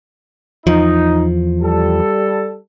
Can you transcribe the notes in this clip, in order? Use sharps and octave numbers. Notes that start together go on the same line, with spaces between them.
E2 F3 D#4
G3 A4